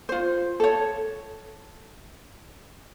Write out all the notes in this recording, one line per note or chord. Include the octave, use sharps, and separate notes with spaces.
F4 C5
A4 C#5